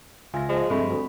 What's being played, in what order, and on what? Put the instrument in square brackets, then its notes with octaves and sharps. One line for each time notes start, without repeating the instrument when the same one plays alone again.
[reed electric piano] C#2 F4 E5 [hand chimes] G#5 A#6
[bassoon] F3 [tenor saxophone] G#3
[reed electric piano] G2 F3 [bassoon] A3 [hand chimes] C4 B5
[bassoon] D2